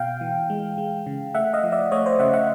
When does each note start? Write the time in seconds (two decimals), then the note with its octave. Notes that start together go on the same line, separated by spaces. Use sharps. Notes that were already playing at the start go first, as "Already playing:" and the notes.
Already playing: B2 F5 G5
0.21 E3
0.50 G#3
0.78 G#3
1.06 C#3
1.34 A3 E5 F#5
1.53 D#5 F5
1.63 F3
1.72 D5 E5
1.91 A3 C#5 D#5
2.06 C5 D5
2.19 C#3 E5 F#5
2.33 E5 F#5